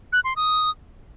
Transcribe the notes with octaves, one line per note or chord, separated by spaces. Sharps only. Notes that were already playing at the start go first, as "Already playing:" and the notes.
F#6
C6
D#6